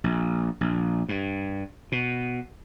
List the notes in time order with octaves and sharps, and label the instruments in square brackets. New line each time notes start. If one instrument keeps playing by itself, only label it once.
[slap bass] A#1
A#1
G2
B2